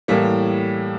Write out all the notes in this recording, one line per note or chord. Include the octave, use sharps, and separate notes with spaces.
A2 E3 G3 A#3